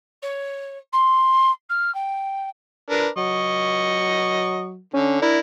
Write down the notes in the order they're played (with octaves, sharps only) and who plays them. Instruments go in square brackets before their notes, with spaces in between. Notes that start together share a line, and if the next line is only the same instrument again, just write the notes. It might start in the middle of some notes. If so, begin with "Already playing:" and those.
[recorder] C#5
C6
F6
G5
[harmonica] D4 A#4 B4
[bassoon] F#3 [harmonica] D#5 C#6
[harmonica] D3 [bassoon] C#4
[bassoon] D4 [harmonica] E4 A#4